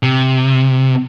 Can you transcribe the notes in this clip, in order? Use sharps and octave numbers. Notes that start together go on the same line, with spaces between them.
C3